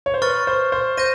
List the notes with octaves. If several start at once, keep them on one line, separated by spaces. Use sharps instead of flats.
C#5
C5
B4 C#6 F6 A6
C5
C5
C5 G6 A#6 D#7